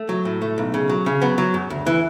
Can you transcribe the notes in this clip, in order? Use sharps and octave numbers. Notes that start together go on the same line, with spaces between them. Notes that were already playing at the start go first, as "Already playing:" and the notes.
Already playing: A3
F#3
A2
A3
B1
C#3
F#3
C#3
F#3 B3
F#3
F#2
D2
E3